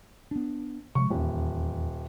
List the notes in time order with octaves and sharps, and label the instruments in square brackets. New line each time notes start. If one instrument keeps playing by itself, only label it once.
[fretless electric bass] B3 D4
[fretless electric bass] C3 F3 G#3 [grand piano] C#6
[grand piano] D#1 [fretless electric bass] E2 C#4